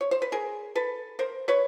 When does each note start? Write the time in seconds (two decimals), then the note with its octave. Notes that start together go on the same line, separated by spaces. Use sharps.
0.01 C#5
0.11 C5
0.22 B4
0.32 G#4 A#4
0.75 A4 B4
1.19 A#4 C5
1.48 B4 C#5